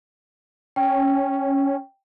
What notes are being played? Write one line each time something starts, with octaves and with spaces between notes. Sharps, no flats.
C#4 G5